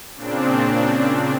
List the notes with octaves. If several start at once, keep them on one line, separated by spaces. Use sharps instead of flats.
A#2 C#3 C4 D4